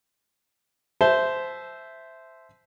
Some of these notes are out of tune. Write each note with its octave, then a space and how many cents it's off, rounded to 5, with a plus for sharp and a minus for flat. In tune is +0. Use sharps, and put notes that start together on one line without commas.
C5 -10 E5 +0 A5 -30